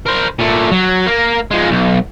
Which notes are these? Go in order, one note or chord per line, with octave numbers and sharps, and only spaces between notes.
A#4 C5
A#2 A3
F#3
A#3
F3 G#3
B1